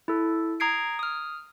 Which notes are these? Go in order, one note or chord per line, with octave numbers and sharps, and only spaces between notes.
E4 A4
A#5 D#6 G#6 C7 D7
D#6 F6